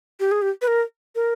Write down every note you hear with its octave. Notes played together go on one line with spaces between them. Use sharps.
G4
G#4
G4
B4
A#4
A#4